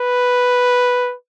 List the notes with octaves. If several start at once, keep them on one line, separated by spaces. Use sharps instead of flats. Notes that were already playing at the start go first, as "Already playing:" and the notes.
Already playing: B4